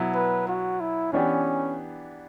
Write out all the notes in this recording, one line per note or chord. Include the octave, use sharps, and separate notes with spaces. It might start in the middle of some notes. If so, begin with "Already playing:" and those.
Already playing: B2 F#3 B3 E4
B4
F#4
E4
E3 B3 C#4 D4 G4